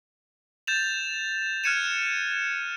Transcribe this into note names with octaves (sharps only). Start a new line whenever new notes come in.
G6 A6 E7 F7
F6 F#6 G#6 C#7 D#7 E7